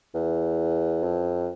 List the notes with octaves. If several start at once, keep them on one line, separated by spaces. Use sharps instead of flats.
E2
F2